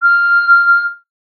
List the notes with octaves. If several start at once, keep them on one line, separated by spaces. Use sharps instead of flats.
F6